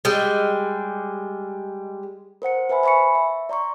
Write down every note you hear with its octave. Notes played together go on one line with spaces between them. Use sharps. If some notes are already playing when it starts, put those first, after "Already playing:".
G3 G#3
A#4 C5 F#5 C#7
B4 C5 E5 G#5 B5
E5 G#5 B5 C#6 C#7
E5
D5 A#5 C6 C#6